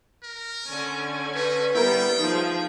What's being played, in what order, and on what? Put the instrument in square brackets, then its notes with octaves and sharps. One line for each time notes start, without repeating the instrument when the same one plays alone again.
[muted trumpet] A#4
[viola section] D3 C#4 G#5
[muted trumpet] D#4 [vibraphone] B4
[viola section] G3 B3 [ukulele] E4 A#4 [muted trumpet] G5
[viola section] F3 G#4 [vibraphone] D#4